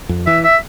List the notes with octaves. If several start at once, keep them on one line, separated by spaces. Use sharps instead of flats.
F2
E3 E5
E5